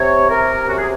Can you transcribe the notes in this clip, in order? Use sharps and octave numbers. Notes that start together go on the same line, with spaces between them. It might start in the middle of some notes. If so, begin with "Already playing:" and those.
Already playing: C3 C#5
C3 A#4
F#2 F#4
G#4